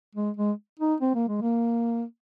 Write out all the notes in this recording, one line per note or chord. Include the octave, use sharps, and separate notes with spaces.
G#3
G#3
D#4
C4
A#3
G#3
A#3